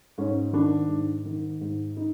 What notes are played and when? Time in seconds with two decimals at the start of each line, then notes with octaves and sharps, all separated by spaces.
0.18 G#2 C#4
0.53 D#3 D4
0.88 G#2
1.25 D#3
1.61 G#2
1.97 D#4